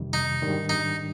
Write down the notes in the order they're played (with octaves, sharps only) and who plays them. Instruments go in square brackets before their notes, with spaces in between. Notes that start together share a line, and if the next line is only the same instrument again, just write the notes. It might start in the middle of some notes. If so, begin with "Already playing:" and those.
Already playing: [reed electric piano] F2 C3 D#3 G3
[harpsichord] D#4
[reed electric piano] G#2 D#3 G3 D4
[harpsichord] D#4